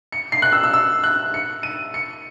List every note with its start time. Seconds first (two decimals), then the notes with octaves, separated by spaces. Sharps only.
0.12 C#7
0.32 C7
0.42 F#6
0.52 E6
0.63 E6
0.73 E6
1.04 F#6
1.34 C#7
1.63 D#7
1.94 C#7